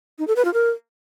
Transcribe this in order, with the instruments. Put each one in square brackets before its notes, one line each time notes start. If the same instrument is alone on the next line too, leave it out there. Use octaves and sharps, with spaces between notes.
[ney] D#4
A4
B4
F4
A#4